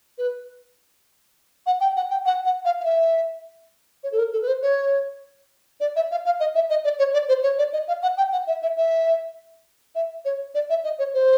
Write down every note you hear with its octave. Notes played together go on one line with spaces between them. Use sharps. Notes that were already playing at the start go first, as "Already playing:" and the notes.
B4
F#5
G5
F#5
G5
F#5
F#5
F5
F5
E5
C#5
A4
A#4
A4
B4
C5
C#5
D5
E5
F5
F5
D#5
E5
D#5
D5
C#5
D5
C5
C#5
D5
D#5
F5
F#5
G5
F#5
E5
E5
E5
E5
C#5
D5
E5
D#5
C#5
C5